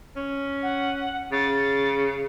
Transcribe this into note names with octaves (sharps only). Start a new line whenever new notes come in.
C#4
F#5
C#3 A6